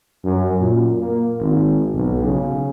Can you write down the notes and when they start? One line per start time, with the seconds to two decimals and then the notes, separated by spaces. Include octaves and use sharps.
0.24 F#2
0.60 A#2
1.00 A#3
1.40 G#1
1.93 B1
2.24 C#3